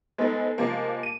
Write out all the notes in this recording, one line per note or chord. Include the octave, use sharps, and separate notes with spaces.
G#3 B3 C4 D#4 A4
C3 F3 G#3 A#3
D#7